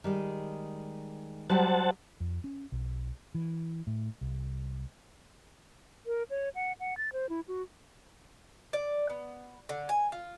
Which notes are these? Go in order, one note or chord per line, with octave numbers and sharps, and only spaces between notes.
D#3 G3 G#3
F#3 G3 G4 C5 F#5 A5
F2
C#4
B1
E3
A2
C2
A#4
C#5
F#5
F#5
A6
C5
E4
F#4
D5
B3
D3
G#5
F4